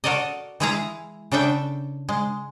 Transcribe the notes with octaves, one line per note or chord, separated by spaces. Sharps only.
F#4 A4 A#4 D5 D#5
E3 G#3 E4 G#4 F5 A#5
C#3 D4 A4 E5 G5
G#3